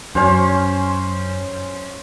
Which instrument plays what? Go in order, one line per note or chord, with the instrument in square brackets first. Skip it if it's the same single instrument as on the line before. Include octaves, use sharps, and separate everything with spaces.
[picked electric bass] F#2 [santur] C#4 C5